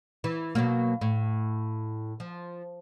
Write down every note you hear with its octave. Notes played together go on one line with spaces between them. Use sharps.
E3
B2 F#3 A#3
A2
F3